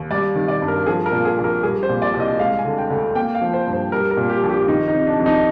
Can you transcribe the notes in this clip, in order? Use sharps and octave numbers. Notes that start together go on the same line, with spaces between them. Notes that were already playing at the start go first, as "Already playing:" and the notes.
Already playing: D#2
G3 D5
D#3
D5
G2
A#4
F3 G#4
A#4
A#2
G#4
A#1
A#4
G3 G#4
C5
A#2
D5
C2
D#5
G#3 F5
G#5
D3
G5
D2
A#3 G5
F5
F3
C5
G2
C5
G3 A#4
A#4
A#2
G4
A#1
G4
D#3 D#4
D#4
C3
D4
F2
D#4